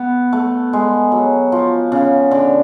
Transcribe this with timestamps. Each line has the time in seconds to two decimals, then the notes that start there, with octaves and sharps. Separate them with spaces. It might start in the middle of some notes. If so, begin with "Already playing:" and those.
Already playing: B3
0.33 A3
0.73 G#3
1.12 F#3
1.52 F3
1.92 C#3
2.31 D3